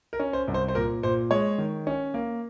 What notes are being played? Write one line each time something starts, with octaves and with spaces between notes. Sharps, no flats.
A#4
C#4
C5
C2
C5
C5
A#2 A#4
A#2 C5
G#3 C#5
D#3
C#4
A#3